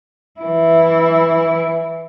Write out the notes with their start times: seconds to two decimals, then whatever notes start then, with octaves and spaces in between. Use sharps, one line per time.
0.41 E3 E4